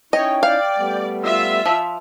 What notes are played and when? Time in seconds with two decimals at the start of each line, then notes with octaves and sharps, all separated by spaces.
0.13 C#4 D#4 E4 C#5 D#5 G5
0.43 D5 F5
0.77 G3 A3 B3
1.24 F4 E5 E6
1.66 F3